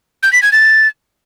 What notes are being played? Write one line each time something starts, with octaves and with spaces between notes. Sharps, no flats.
G6
B6
G#6
A6